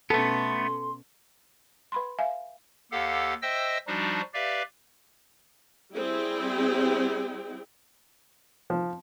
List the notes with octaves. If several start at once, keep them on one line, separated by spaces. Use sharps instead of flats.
B2 A3 B3 C#4 A4 C6
B4 B5 C6
E5 F5 G#5
D#2 G4 A4 F5 F#5
C5 D#5 E5 G5 E6 A#6
F3 G3 D4 D#4 F#4
G4 B4 D5 E5 F5
G3 C4 E4 G#4 G5
F3